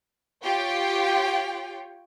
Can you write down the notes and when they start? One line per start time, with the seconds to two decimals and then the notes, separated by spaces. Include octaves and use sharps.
0.43 F4 G4 C#5 G5